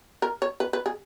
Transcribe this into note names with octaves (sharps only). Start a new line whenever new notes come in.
A#4
C#5
B4
B4
G#4